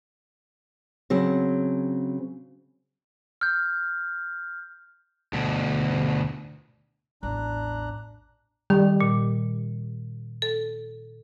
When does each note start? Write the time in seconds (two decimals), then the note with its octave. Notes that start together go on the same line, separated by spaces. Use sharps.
1.10 C#3 F#3 C4
3.41 F6 G6
5.33 D2 B2
7.23 A1 E2 D4 A#5 F#6
8.70 D#3 G3
9.01 A#2
10.42 A4